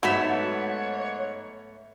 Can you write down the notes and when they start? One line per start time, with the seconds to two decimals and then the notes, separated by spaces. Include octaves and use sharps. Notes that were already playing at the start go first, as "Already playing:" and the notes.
0.03 G#2 F#3 A3 B3 C#5 E5 B6